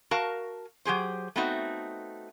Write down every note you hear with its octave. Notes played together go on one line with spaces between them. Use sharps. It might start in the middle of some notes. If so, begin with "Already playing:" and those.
F#4 A#4 F5 A5
F#3 G4 G#4 C5
A3 B3 C4 D#4 F#4